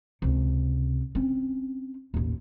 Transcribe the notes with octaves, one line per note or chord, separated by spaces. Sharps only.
C#2 C3
C4 C#4
A1 D#2